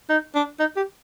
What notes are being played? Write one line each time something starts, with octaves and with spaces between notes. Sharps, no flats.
D#4
D4
D#4
G4